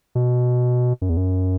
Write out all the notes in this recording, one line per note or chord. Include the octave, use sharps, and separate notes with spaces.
B2
F#2
E2
F#2